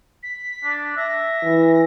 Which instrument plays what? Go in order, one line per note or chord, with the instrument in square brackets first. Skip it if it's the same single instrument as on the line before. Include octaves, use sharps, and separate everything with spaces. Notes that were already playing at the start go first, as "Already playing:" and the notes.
[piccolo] B6
[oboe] D4
[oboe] E5 [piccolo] A#6
[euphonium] E3